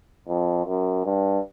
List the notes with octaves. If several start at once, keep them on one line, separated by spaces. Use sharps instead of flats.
F2
F#2
G2